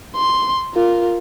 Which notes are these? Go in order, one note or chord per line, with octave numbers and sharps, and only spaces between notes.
C6
F4 A#4